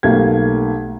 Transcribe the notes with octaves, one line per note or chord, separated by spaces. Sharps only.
B1 A3 A#3 G4 F5 G#6